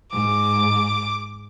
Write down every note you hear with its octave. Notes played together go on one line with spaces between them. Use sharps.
G#2 D6